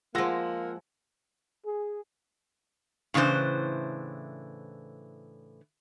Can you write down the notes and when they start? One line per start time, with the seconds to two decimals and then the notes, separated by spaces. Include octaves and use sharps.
0.15 F3 G#3 A#3 F4 F#5 E6 A#6
1.66 G#4
3.14 A2 C#3 E3 D4 C5